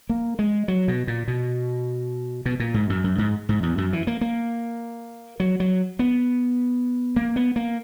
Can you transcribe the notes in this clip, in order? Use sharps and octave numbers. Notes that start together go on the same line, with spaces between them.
A#3
G#3
F#3
B2
A#2
B2
B2
A#2
G#2
F#2
F#2
G#2
G#2
E2
F#2
E3
A#3
A#3
F#3
F#3
B3
A#3
B3
A#3